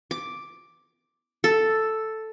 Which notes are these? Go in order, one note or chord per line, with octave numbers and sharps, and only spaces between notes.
D6
A4